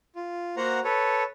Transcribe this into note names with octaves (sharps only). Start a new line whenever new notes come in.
F4
A#3 F#4 C5 F#5 A#5
A4 B4 C#5